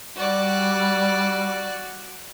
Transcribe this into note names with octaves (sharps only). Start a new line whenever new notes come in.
G3 F#4 D5